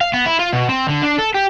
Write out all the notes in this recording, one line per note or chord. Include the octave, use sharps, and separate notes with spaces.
F5
B3
E4
F4
B2
C4
D3
D4
A4
G4